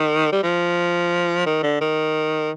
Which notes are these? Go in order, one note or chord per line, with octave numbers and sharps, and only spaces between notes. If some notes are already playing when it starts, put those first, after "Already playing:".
Already playing: D#3
G3
F3
D#3
D3
D#3